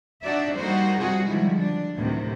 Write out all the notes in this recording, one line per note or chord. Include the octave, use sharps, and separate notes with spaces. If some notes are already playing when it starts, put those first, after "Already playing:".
D4 D#4 F#4 D5 E5
G3 A#3 D#4 F#4 C5
C3 G3 F#4 G#4
D3 D#3 F3 G3 G#3 E4
D4
D2 A2 C3 D#3 F#3